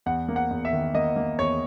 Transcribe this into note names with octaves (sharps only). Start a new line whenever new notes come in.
E2 F#5
A#3
F#5
E2
E5
D#3
A#3 D#5
A#3
E2 C#5